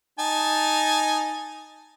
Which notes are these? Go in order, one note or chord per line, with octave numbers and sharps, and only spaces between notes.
D#4 G#5 A5